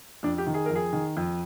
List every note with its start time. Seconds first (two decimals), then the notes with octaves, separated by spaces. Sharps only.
0.23 F2 D4
0.38 G4
0.47 D#3
0.54 G#4
0.66 F2 A#4
0.76 G#4
0.93 D#3
1.17 F2